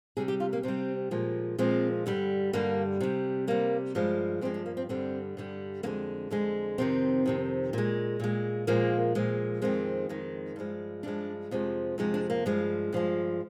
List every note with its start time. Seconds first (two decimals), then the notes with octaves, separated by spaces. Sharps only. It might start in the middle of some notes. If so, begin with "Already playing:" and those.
0.17 C3 G3 G#4
0.28 G4
0.40 F4
0.53 A#3
0.63 C3 G3 C4
1.11 A#2 F3 G#3
1.58 A#2 F3 G#3 C4
2.06 G2 D3 G3
2.53 G2 D3 G3 A#3
3.00 C3 G3
3.47 C3 G3 A#3
3.95 G2 F3 G#3
4.41 G2 F3 G#3 C4
4.54 D4
4.66 A#3
4.77 C4
4.89 G2 D3 G3 C4
5.37 G2 D3 G3
5.83 F2 D3 G#3 A#3
6.30 F2 D3 G#3
6.78 F2 C3 D#3 C4
7.26 F2 C3 D#3
7.73 A#2 G#3
8.20 A#2 G#3
8.67 A#2 F3 G#3 A#3
9.15 A#2 F3 G#3
9.62 F2 D#3 G#3 C4
10.09 F2 D#3 G#3
10.56 G2 F3 G#3
11.03 G2 F3 G#3 D4
11.51 F2 C3 F3 G#3
11.98 F2 C3 F3 G#3 D#4
12.14 D4
12.30 A#3
12.46 G2 F3 G#3
12.92 G2 F3 G#3